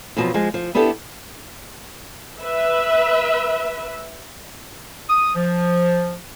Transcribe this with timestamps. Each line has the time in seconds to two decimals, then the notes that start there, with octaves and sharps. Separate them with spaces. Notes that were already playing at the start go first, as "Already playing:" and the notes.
0.17 F2 B2 F3 F#3
0.34 F3 G#3
0.54 F3
0.75 B3 D4 E4 G4 A4
2.40 B4 E5
5.09 D#6
5.35 F3